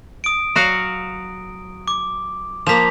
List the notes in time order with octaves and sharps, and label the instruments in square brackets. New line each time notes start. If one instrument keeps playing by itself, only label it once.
[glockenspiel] D#6 D7
[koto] F#3 F#4 F5
[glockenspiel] D6
[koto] F3 A#3 [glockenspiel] B6 F7